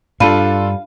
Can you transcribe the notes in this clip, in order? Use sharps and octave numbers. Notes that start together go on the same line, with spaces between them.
G2 D4 F4 A4 F5 A5 B5 D#7